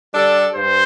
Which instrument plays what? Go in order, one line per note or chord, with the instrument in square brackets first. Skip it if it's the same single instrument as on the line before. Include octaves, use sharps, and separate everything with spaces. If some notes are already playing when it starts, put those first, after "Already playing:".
[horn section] G3 D4 A4 D5
[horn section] G2 [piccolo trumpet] C5